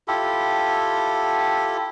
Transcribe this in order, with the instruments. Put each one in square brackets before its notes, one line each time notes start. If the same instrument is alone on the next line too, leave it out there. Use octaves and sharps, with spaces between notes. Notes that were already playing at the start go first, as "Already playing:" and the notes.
[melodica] E4 F4 G4 A4